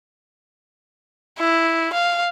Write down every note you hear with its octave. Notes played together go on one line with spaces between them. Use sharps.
E4
F5